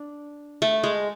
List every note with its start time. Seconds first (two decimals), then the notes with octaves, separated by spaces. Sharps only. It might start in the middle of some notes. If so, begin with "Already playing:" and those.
Already playing: D4
0.62 A3
0.84 G#3